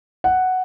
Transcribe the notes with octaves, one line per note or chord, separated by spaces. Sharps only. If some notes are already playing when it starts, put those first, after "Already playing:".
F#5